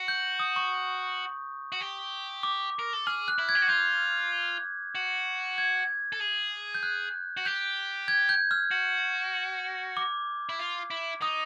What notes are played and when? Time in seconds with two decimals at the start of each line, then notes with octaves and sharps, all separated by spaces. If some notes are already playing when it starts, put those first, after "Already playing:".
Already playing: F#4
0.08 G6
0.40 D#6
0.56 C#6
1.72 F#4
1.81 G4
2.43 D6
2.79 A#4
2.93 A4
3.06 G#4 F6
3.28 F#6
3.39 E4
3.49 G#6
3.55 G4
3.62 F#4
3.69 F4 G6
4.95 F#4
5.58 G#6
6.13 A4
6.20 G#4
6.75 G6
6.83 F#6
7.37 F#4
7.45 G4 G6
8.08 G#6
8.29 G6
8.51 F6
8.71 F#4
9.97 D6
10.49 E4
10.59 F4
10.91 E4
11.21 D#4 D#6